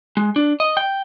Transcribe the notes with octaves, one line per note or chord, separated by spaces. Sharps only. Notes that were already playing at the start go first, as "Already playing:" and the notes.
G#3
D4
D#5
G5